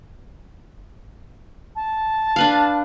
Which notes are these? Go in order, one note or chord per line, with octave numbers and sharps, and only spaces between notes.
A5
D4 B4 F5